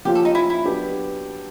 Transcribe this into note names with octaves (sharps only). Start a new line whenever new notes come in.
F3 A#3 C#4 F4 G4
A4
D#4
E4
E4
F#3 B3 D4 G4